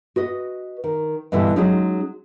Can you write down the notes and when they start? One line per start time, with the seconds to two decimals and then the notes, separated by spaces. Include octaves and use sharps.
0.16 F#4 B4 D#5
0.84 D#3
1.32 G2 B2 D3 E3 G3
1.56 F#3 G#3 C#4 D#4